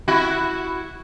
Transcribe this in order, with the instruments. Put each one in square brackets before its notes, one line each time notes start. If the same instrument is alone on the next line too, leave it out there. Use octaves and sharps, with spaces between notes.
[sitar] E4 F#4